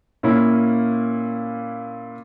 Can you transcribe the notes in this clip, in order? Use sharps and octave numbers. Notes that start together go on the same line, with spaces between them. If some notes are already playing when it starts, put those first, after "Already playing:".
A#2 A#3 C#4 E4